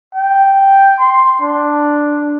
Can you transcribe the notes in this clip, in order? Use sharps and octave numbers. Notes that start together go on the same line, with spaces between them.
G5
C6
D4